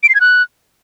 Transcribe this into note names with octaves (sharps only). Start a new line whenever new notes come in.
D7
C7
G#6
F#6